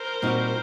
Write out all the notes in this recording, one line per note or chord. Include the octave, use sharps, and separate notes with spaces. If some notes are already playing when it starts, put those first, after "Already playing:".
Already playing: A#4 C5
A#2 G3 C4 D#4 F#4